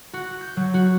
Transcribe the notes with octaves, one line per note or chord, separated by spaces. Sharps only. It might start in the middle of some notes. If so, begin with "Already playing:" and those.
F#4
G6
F#3
F#4